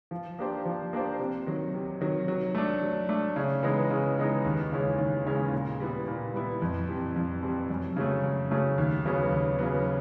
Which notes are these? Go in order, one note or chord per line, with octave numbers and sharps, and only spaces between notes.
F3
A#3 D4 G4 C5
F3
A#3 D4 G4 C5
C3
D#3 F#3
C3
D#3 F#3
F#3
A3 D4
F#3
A3 D4
C#3
E3 G#3 B3 D#4
C#3
E3 G#3 B3 D#4
D#2
C#3 E3 G#3 C#4
D#2
C#3 E3 G#3 C#4
A#2
G3 B3 E4
A#2
G3 B3 E4
F2
C3 E3 G3
F2
C3 E3 G3
F#2
C#3 F#3 A3
F#2
C#3 F#3 A3
D#2
C#3 F#3 B3
D#2
C#3 F#3 B3